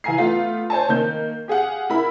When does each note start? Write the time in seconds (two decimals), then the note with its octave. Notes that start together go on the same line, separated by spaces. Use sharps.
0.04 E3 F5 G#5 A#5 C7
0.18 A3 B3 F4 F5
0.70 C5 C#5 G#5 A5
0.89 D#3 A#3 G6
1.48 G4 G#4 F5 F#5
1.90 E4 A#4 B5